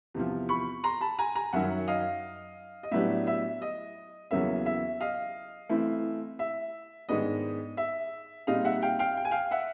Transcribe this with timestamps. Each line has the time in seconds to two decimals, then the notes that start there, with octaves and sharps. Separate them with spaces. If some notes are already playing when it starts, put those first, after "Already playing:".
0.14 E2 C3 F3
0.49 B5 C#6
0.84 A#5 C6
1.01 A5 B5
1.19 G#5 A#5
1.35 G#5 A#5
1.53 F#2 D#3 F#3 E5 F#5
1.88 D#5 F5
2.83 D#5
2.91 A2 F#3 B3 D4 G4 E5
3.27 E5
3.62 D#5
4.31 E2 C#3 F#3 A#3 C#4 E5
4.66 E5
5.01 D#5 F5
5.69 E3 A3 C4 E4
6.39 E5
7.09 G#2 D#3 G#3 B3 D4 D#5
7.77 E5
8.47 A#2 G3 C4 D#4 G#4 D#5 F5
8.65 E5 F#5
8.82 F5 G5
8.99 F5 G5
9.17 G5
9.25 G#5
9.31 F5 G5
9.51 E5 F#5